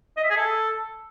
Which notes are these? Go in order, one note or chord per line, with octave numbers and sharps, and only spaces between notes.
D#5
E5
G#4
A4